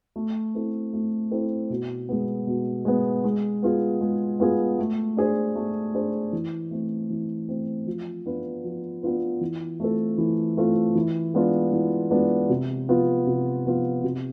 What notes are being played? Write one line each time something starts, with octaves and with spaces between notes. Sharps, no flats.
A3
C4 E4 A4
A3
C4 E4 A4
B2
G#3 B3
B2
G#3 B3
G#3
B3 F4 G#4
G#3
B3 F4 G#4
A3
D4 G#4 C5
A3
D4 G#4 C5
E3
A3 C4
E3
A3 C4
F3
B3 D4 F4 B4
F3
B3 D4 F4 B4
E3
A3 C4 F4 A4
E3
A3 C4 F4 A4
E3
G#3 B3 D4 F4
E3
G#3 B3 D4 F4
C3
F3 B3 F4
C3
F3 B3 F4
C3